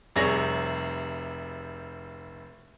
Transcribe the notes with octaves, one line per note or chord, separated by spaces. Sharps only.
F1 C3 G3 G#4 C#5 A#6